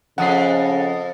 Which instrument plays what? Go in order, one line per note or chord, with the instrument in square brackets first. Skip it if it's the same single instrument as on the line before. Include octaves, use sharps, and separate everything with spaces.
[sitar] F2 [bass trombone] C#3 [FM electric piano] F#5 D#6 C7